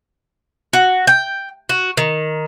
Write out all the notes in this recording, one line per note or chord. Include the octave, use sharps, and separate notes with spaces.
F#4
G5
F#4
D#3